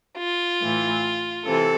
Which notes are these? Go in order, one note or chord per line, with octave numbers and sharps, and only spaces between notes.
F4
A2 E3
C3 E3 A4